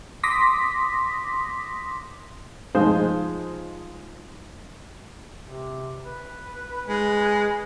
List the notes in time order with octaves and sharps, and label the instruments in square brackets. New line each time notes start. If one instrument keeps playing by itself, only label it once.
[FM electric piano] C6 D6 D#6 A#6 B6
[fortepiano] F3 G#3 D#4 C5
[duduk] C3
B4
[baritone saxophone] G#3